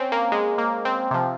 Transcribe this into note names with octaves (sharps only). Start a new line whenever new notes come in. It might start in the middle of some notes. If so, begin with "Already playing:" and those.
Already playing: C4 C#4
A#3
G#3
A#3
C4
C3 F3